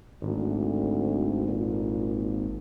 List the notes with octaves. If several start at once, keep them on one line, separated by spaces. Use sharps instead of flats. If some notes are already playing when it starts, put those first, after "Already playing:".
G#1 D2
A#2